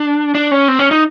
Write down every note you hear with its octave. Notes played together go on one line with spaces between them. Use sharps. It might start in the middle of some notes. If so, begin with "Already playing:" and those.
Already playing: D4
D4
C#4
C4
C#4
D#4